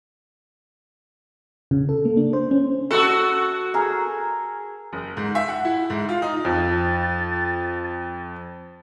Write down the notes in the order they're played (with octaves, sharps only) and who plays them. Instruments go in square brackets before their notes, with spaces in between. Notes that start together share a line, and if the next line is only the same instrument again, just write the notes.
[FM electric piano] C#3
A4
A#3
D4
C5
C#4
[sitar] F#4 A4 [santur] C#6 E6
[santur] G#4 A#4
[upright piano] F#1
G#2
E5
F#5
E4
G#2
F4
D#4
[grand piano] F2 [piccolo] A6